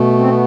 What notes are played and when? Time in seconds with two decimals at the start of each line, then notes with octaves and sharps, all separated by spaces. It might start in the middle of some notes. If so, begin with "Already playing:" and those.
Already playing: B2 A3
0.19 C4
0.31 B3